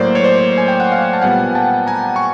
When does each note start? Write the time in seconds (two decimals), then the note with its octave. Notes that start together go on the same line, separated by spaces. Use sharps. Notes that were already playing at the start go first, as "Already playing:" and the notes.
Already playing: A2 F#3 A#3 C5 D5
0.15 C#5
0.24 C5 D5
0.58 G#5
0.68 G5
0.80 F#5
0.92 F5 G5
1.13 A5
1.22 A#2 G3 B3 F#5 G#5
1.55 G5 A5
1.87 G#5 A#5
2.16 C#6